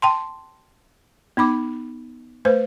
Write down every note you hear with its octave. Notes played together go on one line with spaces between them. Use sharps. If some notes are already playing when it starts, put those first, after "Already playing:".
G5 A5 C6
B3 D#4 B5 D6
A3 B4 C5